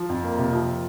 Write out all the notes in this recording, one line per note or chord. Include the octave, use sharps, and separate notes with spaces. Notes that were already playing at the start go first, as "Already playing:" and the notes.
Already playing: F3
F2
A#3
C3
F3